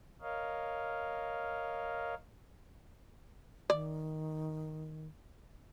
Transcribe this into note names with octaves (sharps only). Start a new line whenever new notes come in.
A#4 C#5 D#5 F5
D#3 D5